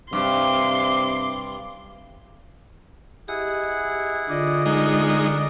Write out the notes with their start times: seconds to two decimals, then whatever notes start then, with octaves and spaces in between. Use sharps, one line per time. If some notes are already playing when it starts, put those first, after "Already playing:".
0.13 G2 C3 C6 D6
3.28 E4 G4 G#4 D#5 F#5
4.29 D3 F4 D5 D#5
4.66 G#3 D#4 A#4 F#5